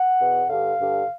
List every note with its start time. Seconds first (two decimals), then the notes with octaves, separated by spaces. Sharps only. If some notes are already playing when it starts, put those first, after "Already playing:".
Already playing: F#5
0.19 E2 B2
0.49 G2 D3 F5
0.79 G2 D3